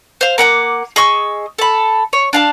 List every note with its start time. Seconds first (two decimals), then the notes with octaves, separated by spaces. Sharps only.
0.21 C5 F5
0.38 A#3 F#5 G#5 D6
0.96 G#4 D#5 C#6 E6
1.59 A4 B5
2.13 C#5
2.33 D4 F5 A5